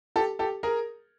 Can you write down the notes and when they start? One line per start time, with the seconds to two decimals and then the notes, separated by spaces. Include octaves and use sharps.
0.16 G4 A4
0.39 G4 A4
0.63 G#4 A#4